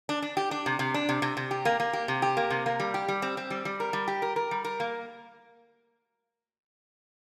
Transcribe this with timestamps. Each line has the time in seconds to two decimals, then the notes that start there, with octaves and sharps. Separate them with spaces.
0.09 D4
0.22 D4
0.37 G4
0.51 D4
0.66 C3
0.79 C3
0.94 D4
1.09 C3
1.22 C3
1.37 C3
1.51 G4
1.65 A#3
1.80 A#3
1.93 G4
2.08 C3
2.22 G4
2.37 A#3
2.50 C3
2.66 A#3
2.80 G3
2.94 G4
3.08 G3
3.22 C4
3.37 C4
3.50 G3
3.65 G3
3.80 A#4
3.93 G3
4.08 G4
4.22 A#4
4.36 A#4
4.51 G3
4.64 A#4
4.80 A#3